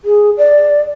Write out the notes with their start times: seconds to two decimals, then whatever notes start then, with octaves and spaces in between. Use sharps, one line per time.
0.05 G#4
0.38 D5